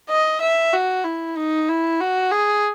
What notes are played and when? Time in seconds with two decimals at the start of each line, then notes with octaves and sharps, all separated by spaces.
0.09 D#5
0.41 E5
0.73 F#4
1.04 E4
1.37 D#4
1.69 E4
2.00 F#4
2.31 G#4